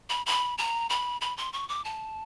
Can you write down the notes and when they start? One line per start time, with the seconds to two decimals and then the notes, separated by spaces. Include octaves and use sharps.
0.10 B5
0.26 B5
0.58 A#5
0.90 B5
1.21 B5
1.37 C6
1.53 C#6
1.69 D6
1.85 A5